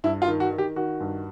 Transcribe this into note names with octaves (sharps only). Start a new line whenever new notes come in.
G2 E4
F4
D#3
F#4
D#3
G4
D#3 F#4
G2